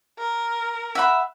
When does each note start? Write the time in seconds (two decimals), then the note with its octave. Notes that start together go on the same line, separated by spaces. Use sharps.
0.18 A#4
0.95 E5 F#5 B5